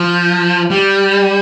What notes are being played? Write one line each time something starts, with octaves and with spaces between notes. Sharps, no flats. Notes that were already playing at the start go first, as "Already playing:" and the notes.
Already playing: F3
G3